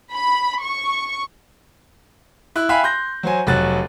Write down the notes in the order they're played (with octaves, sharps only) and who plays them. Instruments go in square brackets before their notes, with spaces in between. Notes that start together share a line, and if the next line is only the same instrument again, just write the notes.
[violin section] B5
C#6
[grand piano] E4 F#6
E5 F5 G5 G#5 B5 F#6
C6 G6 A#6
F#3 C5 G#5
F1 F#3 F#6 A6